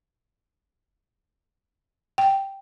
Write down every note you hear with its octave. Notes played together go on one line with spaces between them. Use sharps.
G5